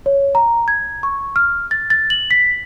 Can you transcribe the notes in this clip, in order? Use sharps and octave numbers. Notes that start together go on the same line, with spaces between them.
C#5
A#5
G#6
C#6
F6
A6
A6
F#7
B6